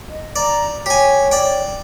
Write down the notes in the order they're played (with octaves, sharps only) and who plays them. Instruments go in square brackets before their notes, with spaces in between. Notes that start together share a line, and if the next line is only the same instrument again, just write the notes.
[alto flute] D#5
[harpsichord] D5 [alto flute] A#5
[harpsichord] G4 G#5 [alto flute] C#5
[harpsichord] D5 G5